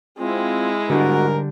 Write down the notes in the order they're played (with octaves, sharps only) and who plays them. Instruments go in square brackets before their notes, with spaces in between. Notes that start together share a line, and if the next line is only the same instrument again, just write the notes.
[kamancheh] G#3 E4 [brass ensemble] C4 [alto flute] F4
[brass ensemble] G#2 A#4 [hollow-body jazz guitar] D3 G3 D4 [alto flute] F#4